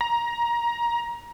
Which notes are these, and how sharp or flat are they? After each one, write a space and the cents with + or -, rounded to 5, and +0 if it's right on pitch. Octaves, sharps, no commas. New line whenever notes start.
A#5 +20